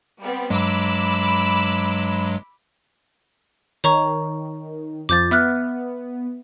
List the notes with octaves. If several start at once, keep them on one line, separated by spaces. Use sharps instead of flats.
G3 B3 C4
G2 F#3 G#3 B5 D6 E6
D#3 C#5 A#5 C#6
F2 F3 D6 G6 A6
B3 E5 F6 F#6